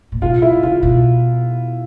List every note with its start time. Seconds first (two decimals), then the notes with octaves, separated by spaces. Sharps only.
0.12 A#2
0.21 B2 F4
0.42 C#3 E4
0.63 C#3 F4
0.83 B2